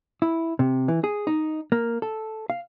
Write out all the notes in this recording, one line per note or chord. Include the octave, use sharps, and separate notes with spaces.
E4
C3
E3
G#4
D#4
A#3
A4
F5